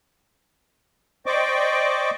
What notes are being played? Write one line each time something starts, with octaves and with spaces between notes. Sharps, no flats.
C5 D5 D#5 G5 C#6 D6